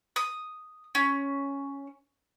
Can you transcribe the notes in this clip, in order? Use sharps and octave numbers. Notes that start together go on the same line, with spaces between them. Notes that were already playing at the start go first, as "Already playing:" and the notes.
D#6
C#4